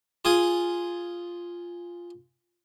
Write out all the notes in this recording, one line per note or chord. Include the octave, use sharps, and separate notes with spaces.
F4 G#4 G#5